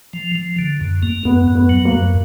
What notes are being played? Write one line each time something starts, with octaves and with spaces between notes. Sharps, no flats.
F3
F3
D3
F#2
A#3
F#2 B3
F#2
B3
F#3
A#3
F#2